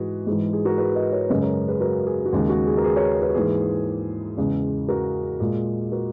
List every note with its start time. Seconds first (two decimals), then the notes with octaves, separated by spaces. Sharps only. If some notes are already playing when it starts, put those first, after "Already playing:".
Already playing: G#2 E3 G#3 F#4 G#4 B4
0.26 G#2 E3 G#3 G#4
0.53 G#4
0.65 F#4 A#4
0.78 G#4 B4
0.95 B4 D#5
1.12 A#4 C#5
1.29 F#2 C#3 G#3 B4 D#5
1.42 A#4 C#5
1.68 G#4 B4
1.80 F#4 A#4
2.07 G#4
2.26 F#4
2.33 D#2 C#3 G#3 G#4
2.49 F#4
2.67 G#4
2.77 A#4
2.84 G#4 B4
2.96 A#4 C#5
3.22 G#4 B4
3.30 F#4
3.34 G#2 E3 A#3 G#4
4.37 E2 C#3 G#3
4.89 F#4 A#4
5.40 A#2 G#3
5.92 F#4 A#4